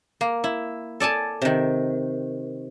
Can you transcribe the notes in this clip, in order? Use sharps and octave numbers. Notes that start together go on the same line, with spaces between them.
A#3
E4
A4 D5 G#5 A5
C3 D#3